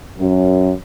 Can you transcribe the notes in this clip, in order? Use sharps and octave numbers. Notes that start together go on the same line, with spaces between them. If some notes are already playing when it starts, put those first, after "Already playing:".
F#2